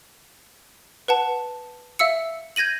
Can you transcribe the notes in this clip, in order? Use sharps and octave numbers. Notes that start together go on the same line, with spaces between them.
B4 F#5 A5
E5 F5 E6 C#7
G6 G#6 A#6 D#7 F#7